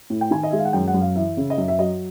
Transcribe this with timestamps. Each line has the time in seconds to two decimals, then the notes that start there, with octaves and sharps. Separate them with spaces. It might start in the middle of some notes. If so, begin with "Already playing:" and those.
0.10 A2
0.21 G5
0.31 D#3 G#5
0.43 D#5
0.51 G#3 E5
0.59 F5
0.65 F#5
0.73 F#2 G5
0.88 F#5
0.94 F#2
1.01 F5
1.15 E3 E5
1.37 C#3
1.50 D#5
1.58 F#2 E5
1.68 E5
1.78 F#3 D#5